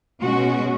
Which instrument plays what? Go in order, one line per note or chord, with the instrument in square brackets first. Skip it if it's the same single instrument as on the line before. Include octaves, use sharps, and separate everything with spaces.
[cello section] B2 G#3 C#4 F#4